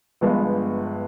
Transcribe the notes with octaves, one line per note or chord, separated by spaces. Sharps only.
G1 G2 F3 G#3 B3